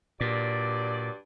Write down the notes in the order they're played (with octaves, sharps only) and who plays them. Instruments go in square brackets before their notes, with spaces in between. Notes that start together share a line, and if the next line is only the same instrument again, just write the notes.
[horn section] G2 F#3 D5 [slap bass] A#2